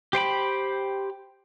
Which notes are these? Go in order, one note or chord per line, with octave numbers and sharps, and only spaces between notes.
G4 C5 G5 B5